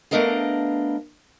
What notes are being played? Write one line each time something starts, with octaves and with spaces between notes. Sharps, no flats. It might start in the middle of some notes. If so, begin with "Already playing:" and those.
A3 B3 D4 A#4 D#5 F5